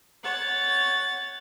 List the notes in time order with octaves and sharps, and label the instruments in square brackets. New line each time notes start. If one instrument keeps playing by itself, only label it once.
[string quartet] C#5 F#5 A6